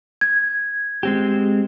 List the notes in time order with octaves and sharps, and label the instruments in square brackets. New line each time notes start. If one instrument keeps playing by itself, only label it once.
[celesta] G#6
[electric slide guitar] G#3 C4 G4